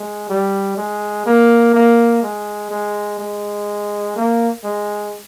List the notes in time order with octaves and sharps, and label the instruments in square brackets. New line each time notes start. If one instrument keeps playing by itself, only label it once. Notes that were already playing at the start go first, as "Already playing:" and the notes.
Already playing: [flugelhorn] G#3
G3
G#3
A#3
A#3
G#3
G#3
G#3
A#3
G#3